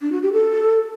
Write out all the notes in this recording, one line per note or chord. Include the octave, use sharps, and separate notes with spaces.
D4
F#4
G4
A4